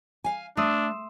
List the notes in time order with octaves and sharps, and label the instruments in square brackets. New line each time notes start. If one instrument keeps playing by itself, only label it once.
[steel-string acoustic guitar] F5 G#5
[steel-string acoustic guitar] A3 [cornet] D4 [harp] C6 D#6 E6